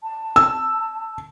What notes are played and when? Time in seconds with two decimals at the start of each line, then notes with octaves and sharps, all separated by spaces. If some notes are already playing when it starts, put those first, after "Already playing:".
0.03 A5
0.36 E6